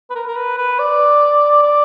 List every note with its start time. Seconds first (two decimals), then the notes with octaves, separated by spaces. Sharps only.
0.10 B4
0.15 A#4
0.27 A#4
0.37 B4
0.57 B4
0.79 D5
1.63 D5